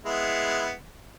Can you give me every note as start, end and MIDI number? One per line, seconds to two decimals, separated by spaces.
0.05 0.73 56
0.05 0.73 59
0.05 0.73 64